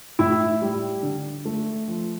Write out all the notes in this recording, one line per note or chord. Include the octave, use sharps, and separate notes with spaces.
A2 E4
G3
D3
A3
F3